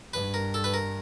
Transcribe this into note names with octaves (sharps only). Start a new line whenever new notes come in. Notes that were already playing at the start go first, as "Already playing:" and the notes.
G2 B4
A#4
A4
B4
A#4